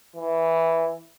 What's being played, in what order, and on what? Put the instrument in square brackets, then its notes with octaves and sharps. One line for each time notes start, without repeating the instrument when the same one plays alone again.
[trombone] E3